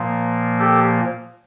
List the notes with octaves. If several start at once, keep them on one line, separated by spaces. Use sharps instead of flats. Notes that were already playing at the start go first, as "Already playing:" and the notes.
Already playing: A#2 F3 A#3
G4 A4